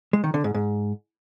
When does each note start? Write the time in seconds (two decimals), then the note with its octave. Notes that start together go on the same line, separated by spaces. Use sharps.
0.13 G#3
0.24 D#3
0.34 D3
0.44 G#2
0.54 G#2